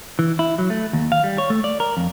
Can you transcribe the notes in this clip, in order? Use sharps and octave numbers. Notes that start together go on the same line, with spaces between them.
E3
E4
F#3
A3
D#2
F5
G3
C#5
A3
D5
A#4
F2